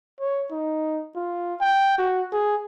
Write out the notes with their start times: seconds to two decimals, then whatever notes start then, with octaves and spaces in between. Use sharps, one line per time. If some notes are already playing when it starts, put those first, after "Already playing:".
0.20 C#5
0.51 D#4
1.16 F4
1.61 G5
1.98 F#4
2.33 G#4